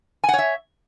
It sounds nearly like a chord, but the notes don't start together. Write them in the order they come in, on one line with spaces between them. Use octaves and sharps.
G#5 F#5 C#5 E5